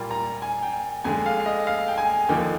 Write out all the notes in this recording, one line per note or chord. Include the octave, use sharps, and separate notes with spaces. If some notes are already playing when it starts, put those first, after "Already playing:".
Already playing: A#2 G3 A#3 F4
A#5
G#5
G5
F2 D3 G#3 G#5
F5
F5
D#5
F5
G5
G#5
D#2 D3 F3 A#3 D#4 G5